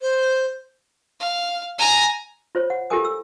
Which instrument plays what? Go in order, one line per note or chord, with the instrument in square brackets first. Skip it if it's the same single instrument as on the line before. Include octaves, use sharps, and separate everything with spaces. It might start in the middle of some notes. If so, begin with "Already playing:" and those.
[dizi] C5
[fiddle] F5
G#5 A#5
[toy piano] F4 C5 C#5
F#5
F4 G4 A4 A#4 G#5 D#6
E6